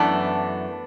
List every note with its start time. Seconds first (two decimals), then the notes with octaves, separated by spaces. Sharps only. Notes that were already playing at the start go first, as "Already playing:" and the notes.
Already playing: F#2 E3 A3 B3 D4